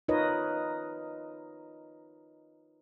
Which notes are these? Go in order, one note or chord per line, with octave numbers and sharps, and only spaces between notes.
D#4 F4 A#4 B4 C#5 D#5